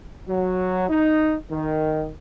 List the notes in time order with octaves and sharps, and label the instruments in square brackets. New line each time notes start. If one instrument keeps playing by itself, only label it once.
[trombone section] F#3
D#4
D#3